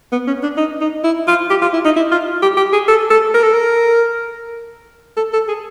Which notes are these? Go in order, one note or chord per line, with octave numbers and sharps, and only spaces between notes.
B3
C#4
D4
D#4
D#4
E4
F4
G4
F4
E4
D#4
E4
F4
G4
G4
G#4
A4
A4
A#4
A4
A#4
A4
A4
G#4